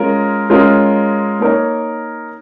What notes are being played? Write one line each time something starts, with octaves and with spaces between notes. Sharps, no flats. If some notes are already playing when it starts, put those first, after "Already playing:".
Already playing: G#3 C#4 F4 A#4
G#3 C#4 F4 A#4
A#3 D#4 A#4 C#5